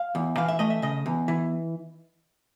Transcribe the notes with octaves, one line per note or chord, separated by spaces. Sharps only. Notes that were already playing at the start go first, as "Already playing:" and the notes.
Already playing: F5
E2
E3 F5
E5
A3 D#5
E5
C#3 D#5
E2
E3